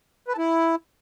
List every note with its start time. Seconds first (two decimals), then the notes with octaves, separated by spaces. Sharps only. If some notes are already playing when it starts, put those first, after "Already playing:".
0.28 B4
0.33 A4
0.38 E4